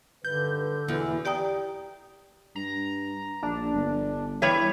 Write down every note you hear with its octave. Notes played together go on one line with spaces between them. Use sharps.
G2 D3 D#3 B4 G6
E2 B2 E3
G4 D5 G5 A#5 D#6
G2 A#5
A#1 D4
G1
E3 G3 C#5 E5